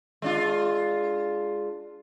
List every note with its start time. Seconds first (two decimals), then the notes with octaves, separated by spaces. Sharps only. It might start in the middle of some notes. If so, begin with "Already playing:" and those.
0.22 G#3 D4 F4